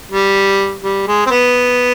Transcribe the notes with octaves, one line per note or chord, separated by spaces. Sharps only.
G3
G3
G#3
C4
B3